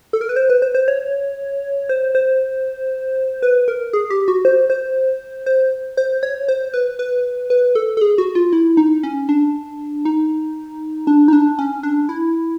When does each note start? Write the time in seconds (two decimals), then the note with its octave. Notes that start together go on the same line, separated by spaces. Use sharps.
0.13 A4
0.21 A#4
0.29 B4
0.36 C5
0.49 B4
0.62 C5
0.75 C5
0.88 C#5
1.89 C5
2.15 C5
3.42 B4
3.68 A#4
3.93 G#4
4.10 G4
4.28 F#4
4.45 C5
4.70 C5
5.46 C5
5.97 C5
6.23 C#5
6.48 C5
6.74 B4
6.99 B4
7.50 B4
7.75 A4
7.97 A4
8.01 G#4
8.18 F#4
8.35 F4
8.53 E4
8.77 D#4
9.03 C#4
9.29 D4
10.05 D#4
11.07 D4
11.28 D#4
11.33 D4
11.59 C#4
11.83 D4
12.09 E4